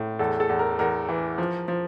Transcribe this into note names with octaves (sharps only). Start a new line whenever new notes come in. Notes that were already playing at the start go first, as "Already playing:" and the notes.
Already playing: A2
E2 A4
A4
E2
A#4
E2 A#4
E3
F3
F3